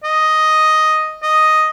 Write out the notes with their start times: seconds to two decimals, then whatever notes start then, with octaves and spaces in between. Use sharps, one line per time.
0.04 D#5
1.23 D#5